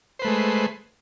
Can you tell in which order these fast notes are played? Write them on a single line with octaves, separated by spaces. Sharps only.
C5 B4 A3 G#3